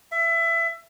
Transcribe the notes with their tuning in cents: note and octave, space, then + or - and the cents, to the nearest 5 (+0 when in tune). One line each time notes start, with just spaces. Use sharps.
E5 +20